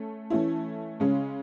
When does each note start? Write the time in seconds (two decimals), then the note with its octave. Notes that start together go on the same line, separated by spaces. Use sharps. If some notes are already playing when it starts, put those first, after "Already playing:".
Already playing: A3 C#4
0.30 E3 A3 C#4 E4
1.00 C#3 G#3 C#4